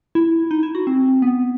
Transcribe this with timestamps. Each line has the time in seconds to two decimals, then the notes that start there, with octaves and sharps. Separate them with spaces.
0.15 E4
0.51 D#4
0.63 E4
0.75 F#4
0.87 C4
1.22 B3